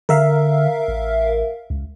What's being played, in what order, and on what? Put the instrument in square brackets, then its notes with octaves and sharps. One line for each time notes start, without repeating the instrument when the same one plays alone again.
[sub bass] D3 [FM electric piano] A#4 E5 F5
[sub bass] A1
C#2